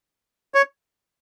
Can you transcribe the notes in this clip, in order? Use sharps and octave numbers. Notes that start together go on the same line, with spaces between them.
C#5